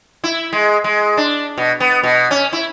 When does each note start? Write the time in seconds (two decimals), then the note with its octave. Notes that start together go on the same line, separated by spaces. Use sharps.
0.24 E4
0.53 G#3
0.84 G#3
1.17 D4
1.58 B2
1.80 B3
2.03 B2
2.31 C#4
2.53 E4